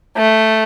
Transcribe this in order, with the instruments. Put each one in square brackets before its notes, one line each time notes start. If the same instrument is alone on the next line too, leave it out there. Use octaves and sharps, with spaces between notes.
[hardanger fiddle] A3